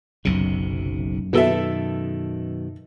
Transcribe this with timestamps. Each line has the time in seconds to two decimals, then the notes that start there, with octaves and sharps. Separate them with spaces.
0.25 F#1 B1 F#2 C3
1.33 B2 D#3 B3 A4 E5